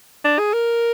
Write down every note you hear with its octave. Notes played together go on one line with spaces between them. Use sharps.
D4
G#4
A#4